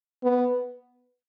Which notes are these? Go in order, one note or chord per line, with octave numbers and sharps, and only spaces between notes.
B3